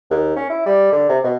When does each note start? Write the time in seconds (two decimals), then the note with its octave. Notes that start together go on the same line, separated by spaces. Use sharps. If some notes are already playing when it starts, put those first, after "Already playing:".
0.10 D#2
0.36 C#4
0.49 E4
0.66 G3
0.92 D3
1.09 C3
1.24 B2